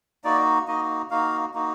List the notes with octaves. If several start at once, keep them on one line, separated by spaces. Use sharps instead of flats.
A#3 D#4 F#4 D5
A#3 D#4 F#4 D#5
A#3 D#4 F#4 F5
A#3 D#4 F#4